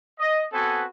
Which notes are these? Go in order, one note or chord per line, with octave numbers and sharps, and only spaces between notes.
D#5
B3 C4 F#4 A4 B4 G#5